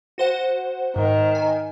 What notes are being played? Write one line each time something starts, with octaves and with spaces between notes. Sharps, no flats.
F#4 C5 F#5
G#2 D#3
G#5